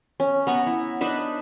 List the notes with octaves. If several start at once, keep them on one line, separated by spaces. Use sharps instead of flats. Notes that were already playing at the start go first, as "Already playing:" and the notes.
C#4
B3 A#5 C#6
E4
D4 D#4 B4 E5